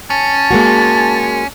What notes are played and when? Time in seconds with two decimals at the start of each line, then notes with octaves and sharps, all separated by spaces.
0.10 C#4 A5
0.51 G#3 A#3 F#4